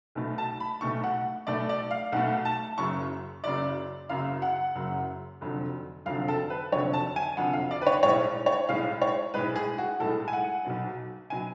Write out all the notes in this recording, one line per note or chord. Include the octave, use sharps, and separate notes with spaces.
B1 B2 A3
A5
B5
B1 B2 A3 C#6
F#5
B1 B2 A3 D5
D5
F5
B1 B2 A3 F#5
A5
F#1 F#2 C#3 F#3 C#6
F#1 F#2 C#3 F#3 D5
F#1 F#2 C#3 F#3 F5
F#5
F#1 F#2 C#3 F#3
F1 F2 D3 F#3
F1 F2 D3 F#3 F5
A4
B4
F1 F2 D3 F#3 C#5
A5
G#5
F1 F2 D3 F#3 F#5
F5
D5
B4
C#5
B1 A2 G#3 C#5
C#5
B1 A2 G#3 F5
C#5
B1 A2 G#3 B4
G#4
F#4
B1 A2 G#3 A4
G#5
F#5
B1 B2 F#3
B2 F#3 G#5